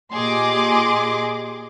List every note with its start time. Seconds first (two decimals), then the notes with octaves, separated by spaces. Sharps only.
0.13 A#2 G4 G#4 D#5 C6 D6